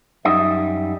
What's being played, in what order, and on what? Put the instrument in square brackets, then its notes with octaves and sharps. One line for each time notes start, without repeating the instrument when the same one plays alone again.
[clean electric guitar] F#2 G3 D#4 D#5 E5